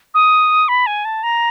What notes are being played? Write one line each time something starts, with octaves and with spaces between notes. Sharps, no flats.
D#6
B5
G#5
A5
A#5